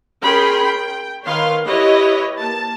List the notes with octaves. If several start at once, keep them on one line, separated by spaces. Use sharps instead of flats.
C#4 G#4 A#4 G5 B5 C6
G5
D#3 B4 C#5 F5 C6
E4 G4 B4 C#5 D#5
A#3 A5